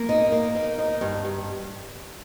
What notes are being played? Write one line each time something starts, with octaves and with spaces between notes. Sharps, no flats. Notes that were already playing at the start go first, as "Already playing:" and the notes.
Already playing: A#3
D#4
A#3
D#4
D#4
G2
G2